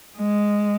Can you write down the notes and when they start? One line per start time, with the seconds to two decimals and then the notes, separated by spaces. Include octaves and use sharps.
0.17 G#3